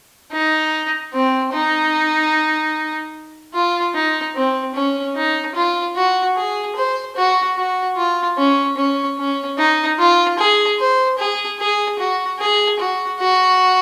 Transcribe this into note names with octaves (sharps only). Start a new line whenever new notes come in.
D#4
C4
D#4
F4
D#4
C4
C#4
D#4
F4
F#4
G#4
C5
F#4
F#4
F4
C#4
C#4
C#4
D#4
F4
G#4
C5
G#4
G#4
F#4
G#4
F#4
F#4